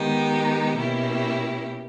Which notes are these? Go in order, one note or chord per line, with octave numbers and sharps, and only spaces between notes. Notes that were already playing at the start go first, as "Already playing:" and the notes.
Already playing: D#3 G#3 B3 D#4 G4
B2 A#3 C#4 E4 G4